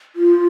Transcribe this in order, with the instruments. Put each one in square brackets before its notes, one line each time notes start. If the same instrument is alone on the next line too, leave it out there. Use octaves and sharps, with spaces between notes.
[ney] F4